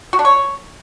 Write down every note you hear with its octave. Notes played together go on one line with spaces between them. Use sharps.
F#4
D4
C#5